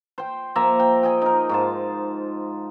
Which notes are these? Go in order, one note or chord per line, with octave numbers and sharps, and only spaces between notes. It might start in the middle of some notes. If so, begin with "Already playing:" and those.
C5 G5
F3 A#3 E5 A#5
G5
G#4 D#5 G5
D#4 A#4
G#2 F4 A5